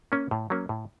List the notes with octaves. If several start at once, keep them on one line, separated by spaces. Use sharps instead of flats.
A#3 C#4
A2
F#3 A#3 C#4
A2